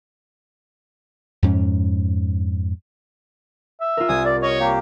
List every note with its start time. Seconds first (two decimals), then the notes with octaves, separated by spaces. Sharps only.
1.43 F2 G#2 C#4
3.81 E5
3.97 F4 A#4
4.09 C2 G#5 D#6 G#6
4.25 D5
4.42 C#5 D#5
4.60 A#3 G4